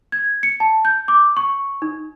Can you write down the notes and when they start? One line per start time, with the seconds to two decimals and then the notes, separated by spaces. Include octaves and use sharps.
0.12 G#6
0.43 C#7
0.60 A5
0.85 G6
1.08 D6
1.37 C#6
1.82 D#4